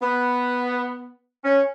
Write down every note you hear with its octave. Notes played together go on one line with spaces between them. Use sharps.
B3
C#4